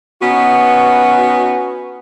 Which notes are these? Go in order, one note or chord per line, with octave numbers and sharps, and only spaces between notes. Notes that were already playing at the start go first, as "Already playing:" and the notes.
B3 C#4 D#4 F#4 B4